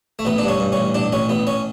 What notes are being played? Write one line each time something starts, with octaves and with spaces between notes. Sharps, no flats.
A3
A1 B3
D4
G2 C#4
G2
C#4
A1
A1 D4
A1 C#4
A1 B3
C#4